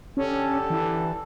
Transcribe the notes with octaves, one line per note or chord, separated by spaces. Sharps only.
D3 C#4 G4 A4
E3